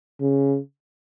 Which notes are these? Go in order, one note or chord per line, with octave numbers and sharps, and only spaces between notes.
C#3